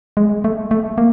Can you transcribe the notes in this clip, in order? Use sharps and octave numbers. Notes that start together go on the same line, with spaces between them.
G#3
A3
A3
A#3